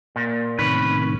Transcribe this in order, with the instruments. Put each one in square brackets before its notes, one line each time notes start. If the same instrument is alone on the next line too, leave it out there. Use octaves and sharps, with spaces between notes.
[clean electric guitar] A#2
[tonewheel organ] A2 C3 D#3 [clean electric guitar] C#4 B4